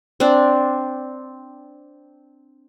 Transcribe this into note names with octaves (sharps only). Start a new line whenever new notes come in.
C4 D4